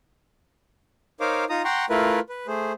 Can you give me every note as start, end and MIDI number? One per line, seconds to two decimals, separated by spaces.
1.20 1.45 63
1.20 1.45 70
1.20 1.45 72
1.20 1.45 73
1.20 1.45 77
1.20 1.45 86
1.49 1.62 63
1.49 1.62 65
1.49 1.62 82
1.49 1.62 87
1.65 1.85 78
1.65 1.85 79
1.65 1.85 82
1.65 1.85 84
1.65 1.85 85
1.90 2.20 57
1.90 2.20 64
1.90 2.20 65
1.90 2.20 70
1.90 2.20 71
2.29 2.47 71
2.47 2.73 57
2.47 2.73 68
2.47 2.73 72